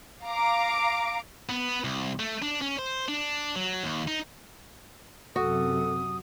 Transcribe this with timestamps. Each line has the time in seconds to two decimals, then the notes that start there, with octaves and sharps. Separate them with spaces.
0.23 F5 A#5 D6
1.49 B3
1.84 C2
2.20 A3
2.42 D4
2.61 C#4
2.79 C5
3.08 D4
3.55 F#3
3.84 D#2
4.08 D#4
5.36 F#2 C3 F#4 A4 D#6